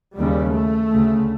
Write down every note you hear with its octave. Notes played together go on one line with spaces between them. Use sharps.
D#2 C#3 G3
A3
D2 C#3